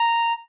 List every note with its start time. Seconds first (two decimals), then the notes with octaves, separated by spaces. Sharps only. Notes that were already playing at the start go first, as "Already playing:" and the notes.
Already playing: A#5